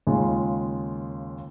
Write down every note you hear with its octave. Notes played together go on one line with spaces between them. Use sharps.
D#2 C#3 G#3 F4